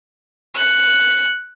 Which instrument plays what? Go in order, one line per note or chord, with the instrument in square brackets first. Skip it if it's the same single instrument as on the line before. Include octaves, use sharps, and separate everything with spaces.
[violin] F#6 C#7